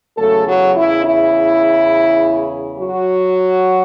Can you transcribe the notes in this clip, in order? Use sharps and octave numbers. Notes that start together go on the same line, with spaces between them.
E2 C#3 F#3 A3 A4
F#3 F#4
E4
E4
F#3 F#4